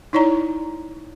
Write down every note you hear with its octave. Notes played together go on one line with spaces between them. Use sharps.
D#4 E4 C#5 D5 A#5